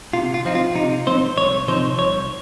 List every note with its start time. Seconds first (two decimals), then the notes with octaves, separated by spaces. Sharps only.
0.13 C3 F4
0.34 F4
0.45 F3 C4 D#4
0.55 F4
0.75 C3 D#4
1.06 F3 C4 D#4 C5
1.37 C2 C#5
1.68 C3 F3 C4 D#4 C5
1.99 C2 C#5